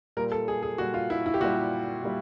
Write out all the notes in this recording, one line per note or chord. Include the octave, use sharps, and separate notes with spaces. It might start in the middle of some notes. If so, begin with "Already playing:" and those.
A#2 G3 A#4
A4
G#4
G#4
A#2 G3 F#4
F4
E4
E4
G4
A#2 G3 F#4
A#2 G3